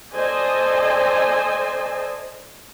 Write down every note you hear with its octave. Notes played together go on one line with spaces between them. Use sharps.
A4 C5 D5 D#5 G#5